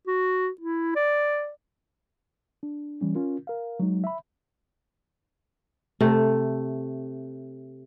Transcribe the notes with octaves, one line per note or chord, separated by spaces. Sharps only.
F#4
E4
D5
D4
E3 G3 C#4
C#4 F4 A#4
A#4 F5
F#3 G#3 D#4
E5 B5
C3 A3